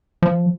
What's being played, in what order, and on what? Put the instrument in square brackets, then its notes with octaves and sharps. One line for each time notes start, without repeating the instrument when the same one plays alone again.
[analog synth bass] F3